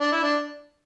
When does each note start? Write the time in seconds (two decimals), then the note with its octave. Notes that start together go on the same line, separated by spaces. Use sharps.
0.01 D4
0.12 E4
0.23 D4